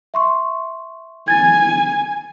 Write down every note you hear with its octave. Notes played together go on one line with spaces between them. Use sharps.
E5 C6 C#6
G#5 G#6 A6